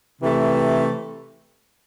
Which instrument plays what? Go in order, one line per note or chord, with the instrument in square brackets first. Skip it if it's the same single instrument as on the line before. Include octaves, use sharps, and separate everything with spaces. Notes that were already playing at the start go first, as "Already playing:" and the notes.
[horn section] C3 E3 A3